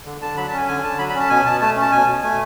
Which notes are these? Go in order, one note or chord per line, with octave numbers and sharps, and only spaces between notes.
D3
D3 A5
F#3 B5
A5
C#4 G#5
D3 G#5
D3 A5
F#3 B5
B5
C#4 A5
B2 G#5
B2 A5
A3 A5
C#4
A5
B2 G#5
B2
A3 G#5